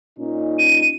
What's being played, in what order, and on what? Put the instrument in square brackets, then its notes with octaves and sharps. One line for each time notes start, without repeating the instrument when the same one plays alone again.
[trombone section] A#2 C#4 D#4
[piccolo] D#7